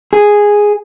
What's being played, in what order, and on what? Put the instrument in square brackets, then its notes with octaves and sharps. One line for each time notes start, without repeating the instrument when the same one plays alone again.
[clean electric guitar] G#4